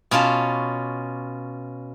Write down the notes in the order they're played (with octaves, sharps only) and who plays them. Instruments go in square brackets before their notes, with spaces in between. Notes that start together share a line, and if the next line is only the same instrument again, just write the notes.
[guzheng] B2 C#4 F4 A5